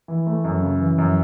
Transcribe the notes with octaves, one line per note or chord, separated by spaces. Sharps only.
E3
A3
F#2
C#3
E3
F#2